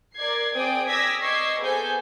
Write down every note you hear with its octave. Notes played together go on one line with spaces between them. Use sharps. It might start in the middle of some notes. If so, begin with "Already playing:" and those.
A#4 D5 G#6 C7
C4 G#4 D5 G5 D#6 D7
D5 D#6 E6 G#6 A#6 B6
D#5 C#6 D6 E6 G#6 C7
B3 G#4 A4 C5 G#5 G6